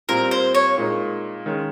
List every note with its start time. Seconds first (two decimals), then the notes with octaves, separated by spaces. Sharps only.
0.09 A#2 G3 C4 A#4
0.31 C5
0.55 C#5
0.77 A#2 G#3 D#4
1.46 D#3 G#3 C#4